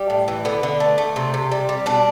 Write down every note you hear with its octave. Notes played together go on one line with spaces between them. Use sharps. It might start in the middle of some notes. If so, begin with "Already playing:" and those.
Already playing: G3 G4
A2
E3
D3 B3
D3
A3
A3
C3
C3
G3
G3
B2 D4